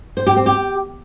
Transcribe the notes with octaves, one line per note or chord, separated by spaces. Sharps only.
C5
G4
C4
G4